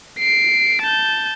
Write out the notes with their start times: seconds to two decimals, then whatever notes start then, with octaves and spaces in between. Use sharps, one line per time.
0.19 C7 D7
0.82 A5 G6